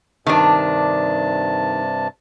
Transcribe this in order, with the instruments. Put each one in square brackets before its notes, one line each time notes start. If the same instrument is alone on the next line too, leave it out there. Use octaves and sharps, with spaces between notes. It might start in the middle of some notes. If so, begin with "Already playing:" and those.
[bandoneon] G2 C3 A5 [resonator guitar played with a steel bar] D#3 D4